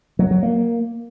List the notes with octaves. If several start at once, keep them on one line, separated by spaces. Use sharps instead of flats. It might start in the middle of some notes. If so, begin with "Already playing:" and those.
F#3
F#3
A#3